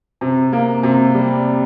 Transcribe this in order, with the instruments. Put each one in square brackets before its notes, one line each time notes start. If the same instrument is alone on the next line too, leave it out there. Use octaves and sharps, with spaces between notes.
[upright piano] C3
A#3
C3
G3